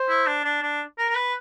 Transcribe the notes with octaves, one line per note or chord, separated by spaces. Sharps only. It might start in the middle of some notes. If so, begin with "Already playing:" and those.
Already playing: C5
E4
D4
D4
D4
A#4
A#4
B4